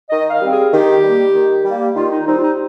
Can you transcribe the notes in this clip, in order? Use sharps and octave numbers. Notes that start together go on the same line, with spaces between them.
D#3 D#5
F5
G3 C4
G#4
D#3 G4
G3 A#3
D#3
G3 A#3
D#3 F4
D#4
G3 C4 D#4
F4
D#4